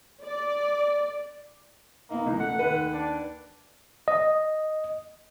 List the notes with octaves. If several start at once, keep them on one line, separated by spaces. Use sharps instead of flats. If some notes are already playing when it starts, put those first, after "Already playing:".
D5
A#3 B3 D#4
C#2 E3
A3 F#5
D#2 B4
D4
D#5